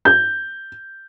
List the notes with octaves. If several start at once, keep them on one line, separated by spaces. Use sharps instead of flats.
G6